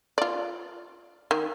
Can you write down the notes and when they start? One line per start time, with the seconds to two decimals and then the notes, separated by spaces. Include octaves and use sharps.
0.18 F4 D5
1.31 D#3